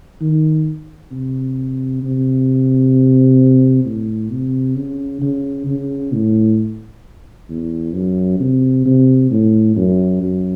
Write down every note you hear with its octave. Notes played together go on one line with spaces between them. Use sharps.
D#3
C3
C3
A2
C3
C#3
C#3
C#3
A2
E2
F#2
C3
C3
A2
F#2
F#2